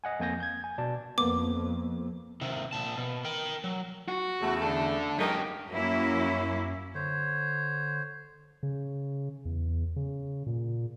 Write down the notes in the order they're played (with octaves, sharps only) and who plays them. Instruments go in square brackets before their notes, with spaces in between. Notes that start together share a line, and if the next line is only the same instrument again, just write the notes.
[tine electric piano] D#5 F#5 G#5
F2 A#3 G#5 G6 A#6
G6 G#6
G#5
B2 D5 A5
[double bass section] F2 [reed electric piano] A#3 B3 [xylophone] D6
[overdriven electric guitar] C3 D#3
A#2 A5
B2
A#4 G5
F#3
[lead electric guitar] F#4
[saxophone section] E2 C#3 A3
[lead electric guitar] D4 A4
[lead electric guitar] F#2 G4 [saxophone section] G#3 D#4 A#4
[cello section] F#2 F#3 A#3 C#4 E4
[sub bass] D3 [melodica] C5 C#5
[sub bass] C#3
E2
C#3
A#2